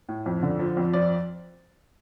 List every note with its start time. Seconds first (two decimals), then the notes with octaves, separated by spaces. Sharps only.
0.09 A2
0.26 F2
0.43 D3
0.59 F3
0.77 F2
0.94 F3 D5